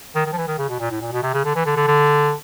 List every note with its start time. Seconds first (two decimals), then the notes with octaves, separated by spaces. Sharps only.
0.15 D#3
0.26 D#3
0.33 F3
0.37 E3
0.47 D#3
0.58 C#3
0.69 B2
0.80 A#2
0.91 A2
1.01 A#2
1.12 B2
1.23 C3
1.34 C#3
1.44 D3
1.55 E3
1.66 D3
1.76 D3
1.87 D3